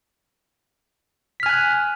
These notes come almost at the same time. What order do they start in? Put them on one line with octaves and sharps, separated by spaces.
B6 F6 G#5 F#6